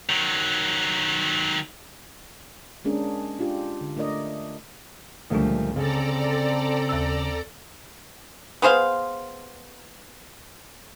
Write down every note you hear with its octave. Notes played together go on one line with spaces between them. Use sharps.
D#3 F#3
G#3 A#3 C#4 D4 G#4 A#4
D4 F4 G4
D3
A3 D4 A#4 D5 D#5
C#2 A#2 D3 F3 G3 A3 D4
C#3 C4 A4 D5 A#5
D#2 E6
B3 G#4 C5 F5